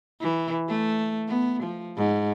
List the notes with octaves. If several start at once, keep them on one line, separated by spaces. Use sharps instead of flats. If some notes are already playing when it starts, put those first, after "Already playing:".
E3
A3
B3
F3
G#2